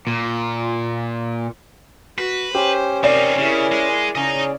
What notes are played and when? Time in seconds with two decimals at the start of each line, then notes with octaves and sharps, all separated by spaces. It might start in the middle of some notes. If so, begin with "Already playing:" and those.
0.07 A#2
2.18 F#4 B4
2.55 C#4 G4 C5
3.04 C3 C4 D#4 A#4 D5
3.38 C#3 E4 A#4
3.72 G#3 G#4
4.15 C#3 C#4 G#4 D#5 A#5